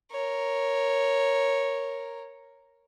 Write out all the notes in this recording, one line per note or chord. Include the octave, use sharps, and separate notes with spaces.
A#4 C#5